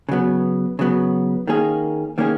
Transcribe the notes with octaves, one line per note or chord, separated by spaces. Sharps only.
C#3 F#3 B3
C#3 F#3 B3
D#3 A#3 C#4 G#4
D#3 A#3 C#4 G#4